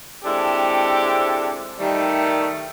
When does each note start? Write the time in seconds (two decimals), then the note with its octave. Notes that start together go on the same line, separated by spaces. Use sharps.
0.24 G#3 C4 D4 E4 G4 A4
1.79 D#3 G3 A3